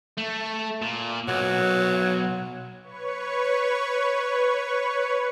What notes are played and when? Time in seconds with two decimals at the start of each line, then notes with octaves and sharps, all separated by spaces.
0.18 A3
0.82 A#2
1.28 B1 F#3
2.83 B4 C#5 C#6